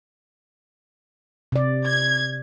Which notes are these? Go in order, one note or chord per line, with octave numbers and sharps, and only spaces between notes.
C3 D5
G#6